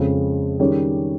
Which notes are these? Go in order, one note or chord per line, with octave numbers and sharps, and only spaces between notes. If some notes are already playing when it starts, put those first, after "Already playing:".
Already playing: F2 C#3 G#3 C4
D#3 G3 C#4 G#4 C#5